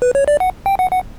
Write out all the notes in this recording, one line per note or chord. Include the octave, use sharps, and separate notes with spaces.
B4
C#5
D5
F#5
G5
F#5
F#5